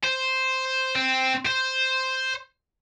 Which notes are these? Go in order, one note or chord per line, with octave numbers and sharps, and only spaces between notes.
C5
C4
C5